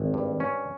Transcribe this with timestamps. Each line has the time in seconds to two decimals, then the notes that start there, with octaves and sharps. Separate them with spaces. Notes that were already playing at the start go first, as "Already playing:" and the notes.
Already playing: G#1
0.14 G2
0.40 C#4